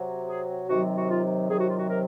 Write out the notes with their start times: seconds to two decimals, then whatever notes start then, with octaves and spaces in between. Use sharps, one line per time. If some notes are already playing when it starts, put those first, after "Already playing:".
Already playing: C3 F#3
0.29 G#4
0.69 C3 D#3 F#3 F#4
0.97 F#4
1.10 F4
1.49 C3 D#3 F#3 G#4
1.59 F#4
1.69 F4
1.79 F#4
1.89 A#4